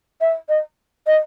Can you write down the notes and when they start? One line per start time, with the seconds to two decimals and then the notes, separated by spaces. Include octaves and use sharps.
0.21 E5
0.49 D#5
1.07 D#5